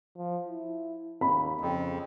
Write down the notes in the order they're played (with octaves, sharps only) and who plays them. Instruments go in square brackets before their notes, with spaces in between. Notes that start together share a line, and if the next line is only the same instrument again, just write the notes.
[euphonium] F3
E4
[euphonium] D#2 [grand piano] B5
[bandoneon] F2 [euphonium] C#3